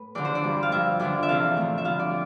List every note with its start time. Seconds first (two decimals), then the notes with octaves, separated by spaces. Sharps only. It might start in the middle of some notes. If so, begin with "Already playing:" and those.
Already playing: A2 B4
0.15 E2 D3 F3 D5
0.25 C5
0.35 D5
0.44 G2 F3
0.63 F5
0.72 G2 F3 E5
1.00 F2 D3 F3 D5
1.23 E5
1.29 E2 C3 E3 F5
1.57 A2 F3
1.78 E5
1.84 G2 D3 F3 F5
1.99 D5